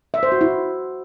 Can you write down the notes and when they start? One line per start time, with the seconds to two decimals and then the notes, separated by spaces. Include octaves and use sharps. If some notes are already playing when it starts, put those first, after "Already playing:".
0.14 E5
0.23 C5
0.32 F#4
0.41 E4